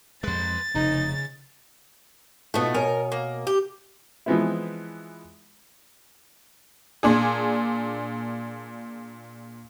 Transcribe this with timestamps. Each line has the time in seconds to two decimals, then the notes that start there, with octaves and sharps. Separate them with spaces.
0.24 F2 G#3 B4 C6 A6
0.75 F1 C#3 D#4
2.54 B2 A3 B3 D#4 F4
2.75 B2 A#4 C#5 G#5
3.12 A#3
3.47 G4
4.26 E3 F3 G#3 B3 C4 E4
7.03 A#2 D4 G#4